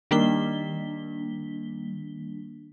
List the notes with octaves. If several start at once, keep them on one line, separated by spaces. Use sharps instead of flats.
D#3 G3 A#3 D4 B6 G7